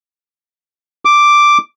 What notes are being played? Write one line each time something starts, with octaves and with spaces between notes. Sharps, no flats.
D6